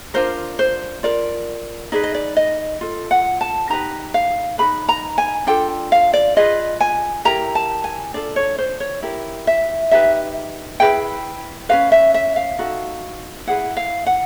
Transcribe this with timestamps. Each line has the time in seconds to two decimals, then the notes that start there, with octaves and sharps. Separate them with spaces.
0.14 D4 F4 A#4 C5
0.59 C5
1.03 F4 A#4 D5
1.92 D#4 G#4 B4 D5
2.03 D#5
2.14 D5
2.37 D#5
2.81 F4 A4
3.11 F#5
3.41 A5
3.70 D#4 G4 B4 A#5
4.14 F5
4.58 D#4 G#4 B4 B5
4.89 A#5
5.18 G#5
5.47 D4 F4 A4 G5
5.92 F5
6.13 D5
6.36 F4 G#4 B4 D#5
6.80 G#5
7.25 E4 G4 A#4 A#5
7.55 A5
7.84 G#5
8.14 D4 F4 A4 D5
8.36 C#5
8.58 C5
8.80 C#5
9.02 E4 G4 A#4
9.47 E5
9.91 D#4 G4 B4 E5
10.80 E4 G#4 B4 G5
11.69 C#4 F#4 B4 F5
11.92 E5
12.14 E5
12.36 F5
12.58 D#4 F#4 A4
13.47 E4 G#4 B4 F#5
13.77 F5
14.06 F#5